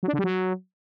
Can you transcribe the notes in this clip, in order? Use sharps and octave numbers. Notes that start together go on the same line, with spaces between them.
F#3
D4
D3
G3
F#3